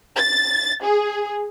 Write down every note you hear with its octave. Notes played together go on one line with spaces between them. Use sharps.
A6
G#4